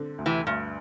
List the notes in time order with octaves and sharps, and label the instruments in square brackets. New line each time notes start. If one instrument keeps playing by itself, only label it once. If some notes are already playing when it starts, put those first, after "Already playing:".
Already playing: [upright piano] D3 C4
D2
[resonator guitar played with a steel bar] C3 E3
[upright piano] D2 [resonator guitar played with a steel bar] G2